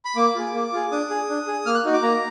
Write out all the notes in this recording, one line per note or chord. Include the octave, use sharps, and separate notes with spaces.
B5
A#3 D6
F4 G#4
A#3
F4 G#4
D4 D#6
G#4
D4
G#4
A#3 F6
F#6
D#4 F#4
D6
A#3 A#5